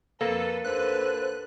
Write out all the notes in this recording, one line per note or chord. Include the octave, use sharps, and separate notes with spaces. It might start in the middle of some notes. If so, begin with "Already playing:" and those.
F2 A#3 A4 B4
D#2 D3 B4 C5 F#6